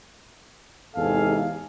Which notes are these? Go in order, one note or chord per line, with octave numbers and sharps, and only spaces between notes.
E2 G#2 C3 A4 F5 G#5